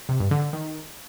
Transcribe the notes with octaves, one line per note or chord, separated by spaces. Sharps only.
C3
G2
D3
D3
D#3